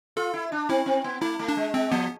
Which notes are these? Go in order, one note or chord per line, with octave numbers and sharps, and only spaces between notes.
F4 A4
E4
D4
C4 E4
C4
B3
A3 E4
A3
D4
G#3
G#3 C4
F3 B3